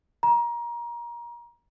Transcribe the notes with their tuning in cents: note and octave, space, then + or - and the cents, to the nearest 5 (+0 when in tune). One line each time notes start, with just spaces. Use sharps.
A#5 +25